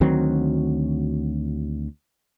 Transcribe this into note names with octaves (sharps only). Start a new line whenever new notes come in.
D2 D#3 F#3 C4